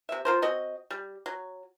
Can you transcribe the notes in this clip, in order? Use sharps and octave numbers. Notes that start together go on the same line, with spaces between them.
C3 E5
F4 A#4 C5
C4 F#4 D#5
G3
F#3